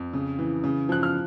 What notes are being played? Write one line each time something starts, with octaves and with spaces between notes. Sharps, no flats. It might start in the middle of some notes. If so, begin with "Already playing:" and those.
Already playing: F2
C#3
E3
C#3
F3 F#6
F6